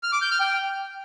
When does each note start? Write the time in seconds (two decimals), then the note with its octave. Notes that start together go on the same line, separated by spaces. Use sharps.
0.03 F6
0.12 D6
0.22 G6
0.31 F6
0.40 G5